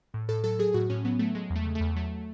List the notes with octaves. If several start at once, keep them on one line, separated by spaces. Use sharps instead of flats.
A2
A2 A4
F#3 A4
F#3 G#4
A2 F#4
A2 C#4
F#3 B3
F#3 A3
F#3 G#3
E2
A3
C#3
A3
E2
F#3 A3